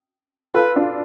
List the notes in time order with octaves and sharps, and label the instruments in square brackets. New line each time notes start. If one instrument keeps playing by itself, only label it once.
[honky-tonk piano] F4 A4 [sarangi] B4
[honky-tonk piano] D4 F4